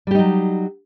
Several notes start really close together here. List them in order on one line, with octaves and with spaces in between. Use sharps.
G3 G4 D#4 F#3